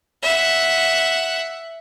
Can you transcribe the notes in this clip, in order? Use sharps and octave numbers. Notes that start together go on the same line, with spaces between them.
E5 F#5